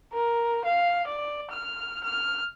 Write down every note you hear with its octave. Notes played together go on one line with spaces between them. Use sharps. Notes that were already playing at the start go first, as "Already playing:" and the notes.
A#4
F5
D5
F6
F6